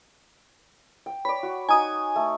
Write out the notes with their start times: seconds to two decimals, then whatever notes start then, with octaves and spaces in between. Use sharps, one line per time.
1.06 G5
1.25 C#5 D5 B5
1.43 F#4
1.69 D#4 F#4 G#5 D#6
2.16 A3